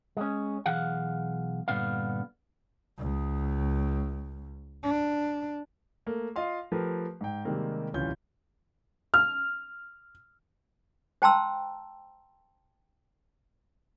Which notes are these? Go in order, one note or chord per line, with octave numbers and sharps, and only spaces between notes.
G#3 C#4
B1 E3 G#4 F5 F#5
G2 A#2 D3 B3 F5
C#2
D4
A3 A#3
F4 D#5 F5 C6
F3 A3 G4 A#4 B4
G#2 G5
C3 D#3 G3 G#3 A#3 C4
D1 C2 E3 C#4 F4 G6
F6
C5 G5 A5 A#5 C6 E6